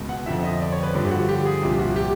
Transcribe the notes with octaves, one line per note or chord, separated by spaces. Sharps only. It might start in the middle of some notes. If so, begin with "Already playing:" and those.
Already playing: C#2 B2
F#5
F2 D3 F3 E5
D#5
D5
C#5
B4
G2 D3 F3
G4
F#4
G4
G#4
C2 A#2 F3 G4
F#4
G4